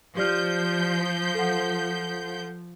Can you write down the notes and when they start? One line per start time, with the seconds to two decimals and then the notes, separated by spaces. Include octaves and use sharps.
0.17 F3 G4 D5 F6 G6
1.35 A4 F#5